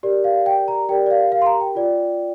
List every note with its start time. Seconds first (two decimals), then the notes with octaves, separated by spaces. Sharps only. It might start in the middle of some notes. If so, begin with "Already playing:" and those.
0.03 G4 A#4 D5
0.24 F5
0.46 G5
0.68 A#5
0.89 G4 A#4 D5 G5
1.06 D5
1.11 F5
1.32 F5
1.42 C6
1.46 A#5
1.61 G5
1.75 F4 D5